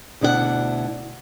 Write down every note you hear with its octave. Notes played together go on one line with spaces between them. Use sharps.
D2 B2 D4 E4 A#4 F#5